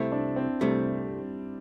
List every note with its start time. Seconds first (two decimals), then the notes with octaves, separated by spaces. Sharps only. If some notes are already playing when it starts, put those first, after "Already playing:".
Already playing: C2 C3 A3 E4
0.12 D4
0.36 C4
0.61 C2 C3 G3 A3